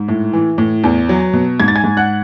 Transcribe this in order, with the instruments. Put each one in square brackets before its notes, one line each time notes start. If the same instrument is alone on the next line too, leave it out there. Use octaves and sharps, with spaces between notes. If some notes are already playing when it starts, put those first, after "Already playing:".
Already playing: [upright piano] G#2
A2
E3
A2
E2
F#3
B2
G#2 G#6
A6
G#5 G#6
G#2
F#5 F#6